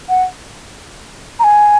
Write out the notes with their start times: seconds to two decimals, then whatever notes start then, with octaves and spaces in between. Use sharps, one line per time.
0.09 F#5
1.39 A#5
1.44 G#5